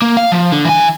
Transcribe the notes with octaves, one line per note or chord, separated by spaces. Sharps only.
A#3
F5
F3
D3
E3 G#5